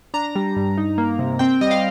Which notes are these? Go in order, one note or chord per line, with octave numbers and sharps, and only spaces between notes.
D4 A#5
G3
G2
D#4
A#3
C3
C4 G5
G3 D#5
F5